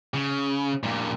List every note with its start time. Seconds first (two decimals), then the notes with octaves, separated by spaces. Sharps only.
0.14 C#3
0.83 G2 A#2